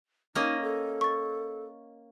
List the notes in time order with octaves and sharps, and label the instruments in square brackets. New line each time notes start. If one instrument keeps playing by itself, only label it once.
[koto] A#3 C#4 D#5 [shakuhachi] D#4
[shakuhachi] A4
[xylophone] C#6 A6